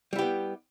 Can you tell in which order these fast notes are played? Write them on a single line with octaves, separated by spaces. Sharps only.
G3 E4 G4 B3